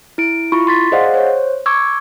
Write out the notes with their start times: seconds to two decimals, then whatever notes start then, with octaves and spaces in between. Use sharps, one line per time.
0.18 E4 D7
0.52 E4 F4 B5 C#6
0.67 C6 A6 B6
0.92 G#4 C5 D5 D#5 F5 F#5
1.14 C5 C#5
1.66 C#6 D6 E6 G#6